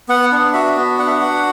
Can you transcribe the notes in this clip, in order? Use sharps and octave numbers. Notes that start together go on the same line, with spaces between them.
B3 F#5
D4
F#4 E5
B3
D4 F#5
E5
F#5
F#4